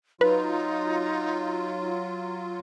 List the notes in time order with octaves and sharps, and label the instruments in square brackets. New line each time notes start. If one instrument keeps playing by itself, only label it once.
[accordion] F#3 F4 [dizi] D#4 [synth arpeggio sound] B4